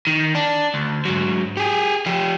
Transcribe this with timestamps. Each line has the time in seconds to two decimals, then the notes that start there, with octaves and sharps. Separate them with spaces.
0.07 D#3
0.35 D4
0.74 D2
1.05 G#2 F#3
1.57 G4 G#4
2.06 F3 G4